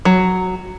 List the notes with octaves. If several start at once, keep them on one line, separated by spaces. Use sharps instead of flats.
F#3